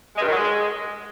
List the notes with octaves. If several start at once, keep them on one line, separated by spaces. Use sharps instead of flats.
G#3
G2
D#3
F#3
G#3